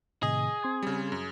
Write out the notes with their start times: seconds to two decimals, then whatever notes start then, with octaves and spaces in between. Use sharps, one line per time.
0.23 A2 C3 D#3 G#4 D#5
0.63 C4 C6 G#6
0.83 C#3 G3
1.12 F#2